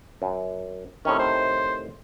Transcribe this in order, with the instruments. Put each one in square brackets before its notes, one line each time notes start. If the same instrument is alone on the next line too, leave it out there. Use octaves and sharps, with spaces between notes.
[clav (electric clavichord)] F#2
[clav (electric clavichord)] A2 C3 D#3 [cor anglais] C#4
[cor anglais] C5